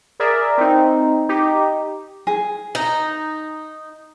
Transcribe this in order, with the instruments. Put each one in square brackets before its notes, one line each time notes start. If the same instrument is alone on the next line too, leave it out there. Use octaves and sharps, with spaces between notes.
[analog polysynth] G#4 A#4 D5 E5
C4 D#4
D#4 G4
[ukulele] G#4
[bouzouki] D#4